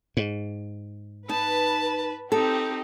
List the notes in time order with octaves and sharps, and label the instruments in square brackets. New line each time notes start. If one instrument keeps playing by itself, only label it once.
[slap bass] G#2
[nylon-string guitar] D#4 [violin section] B4 [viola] A5
[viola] C4 D#4 [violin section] G4 [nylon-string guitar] A4